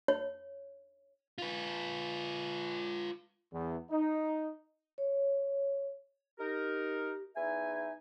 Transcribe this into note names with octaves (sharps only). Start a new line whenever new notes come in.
C#5
F4 B4
E2
D#4
C#5
D#4 G4 A#4
E2 D#4 E5 G#5